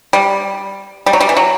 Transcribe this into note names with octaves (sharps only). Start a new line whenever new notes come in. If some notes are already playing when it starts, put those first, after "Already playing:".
G3
G3
F#3
G3
E3
F#3